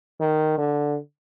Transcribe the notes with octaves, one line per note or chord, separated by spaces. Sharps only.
D#3
D3